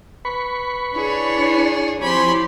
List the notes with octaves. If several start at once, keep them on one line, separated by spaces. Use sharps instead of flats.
B4 B5 C#6
D4 E4 G#4 C#5
F3 C4 G4 C#5 G#5 B5 C6